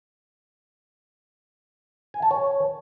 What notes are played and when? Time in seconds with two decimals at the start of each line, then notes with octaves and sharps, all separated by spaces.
2.14 G#5
2.22 A5
2.31 C#5